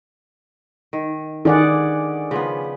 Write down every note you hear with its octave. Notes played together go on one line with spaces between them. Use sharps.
D#3
D3 D#3 G#4 D5 F#5
C#3 F3 B3